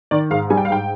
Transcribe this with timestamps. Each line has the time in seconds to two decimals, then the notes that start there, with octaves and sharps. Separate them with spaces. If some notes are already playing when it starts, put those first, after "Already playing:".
0.11 D#3 D5
0.31 G#2 F5
0.50 G3 G#5
0.57 G5
0.65 F5
0.70 G#2 G5